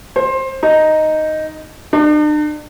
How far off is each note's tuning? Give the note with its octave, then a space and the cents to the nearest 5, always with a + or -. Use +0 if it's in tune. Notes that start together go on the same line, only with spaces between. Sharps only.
C5 +20
D#4 +0
D4 +45